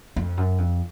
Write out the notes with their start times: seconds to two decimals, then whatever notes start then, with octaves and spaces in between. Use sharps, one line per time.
0.16 F2
0.37 F#2
0.58 F2